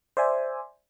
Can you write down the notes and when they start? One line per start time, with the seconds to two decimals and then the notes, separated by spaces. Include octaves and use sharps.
0.17 C5 D5 E5 G#5